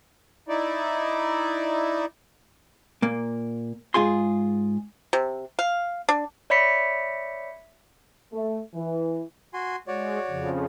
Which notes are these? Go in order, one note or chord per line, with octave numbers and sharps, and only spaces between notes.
D#4 E4 D5
A#2 A#3
G#2 F4 G#4 C6
C3
F5
D4
C#5 D5 E5 B5 B6 C#7
A3
E3
F#4 G#5 C6
G#3 F#4 C#5 D5
F2 C#3 F3